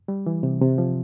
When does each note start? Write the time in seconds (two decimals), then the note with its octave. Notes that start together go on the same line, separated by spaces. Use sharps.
0.08 G3
0.26 E3
0.43 C3
0.61 C3
0.78 F3